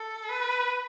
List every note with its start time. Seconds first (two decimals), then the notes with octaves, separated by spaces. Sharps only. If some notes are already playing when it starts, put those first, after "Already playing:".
Already playing: A4
0.28 B4